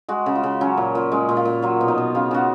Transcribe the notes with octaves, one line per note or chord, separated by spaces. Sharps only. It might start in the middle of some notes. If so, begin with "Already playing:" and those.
G#3 F#4
C#3
F4
C#3
F#3 C#4
A#2
A#2
G#3 C#4
A#2
F4
A#2
F#3 F4
B2
D#4
B2
C#3 F4
C#3 F#4